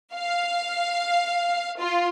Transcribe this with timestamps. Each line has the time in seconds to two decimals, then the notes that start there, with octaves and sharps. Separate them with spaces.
0.15 F5
1.79 F4